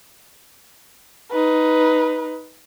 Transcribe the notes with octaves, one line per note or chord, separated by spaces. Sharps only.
D#4 B4